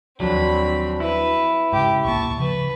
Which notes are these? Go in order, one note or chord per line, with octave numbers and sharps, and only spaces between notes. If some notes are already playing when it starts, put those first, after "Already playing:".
D#2 F3 F#3 C4 D4 B5
E4 B4
G#2 C#3 G4
D1 B1 A#3 A5 C#6
C#3 F3 B4